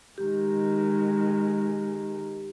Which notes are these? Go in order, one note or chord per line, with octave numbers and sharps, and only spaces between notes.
D#3 G#3 G4